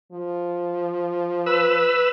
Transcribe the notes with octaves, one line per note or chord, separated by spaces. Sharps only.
F3
B4 E6